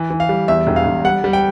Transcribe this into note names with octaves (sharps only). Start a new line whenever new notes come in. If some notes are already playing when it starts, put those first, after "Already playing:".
Already playing: E3
E3
F5
G3
E2 E5
E1
F5
E1
G3 F#5
G3
G5